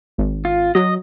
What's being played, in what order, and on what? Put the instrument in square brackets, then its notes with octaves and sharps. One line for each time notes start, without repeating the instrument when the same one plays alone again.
[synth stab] G#1
[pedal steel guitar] F4
[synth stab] F#3 [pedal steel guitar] D#5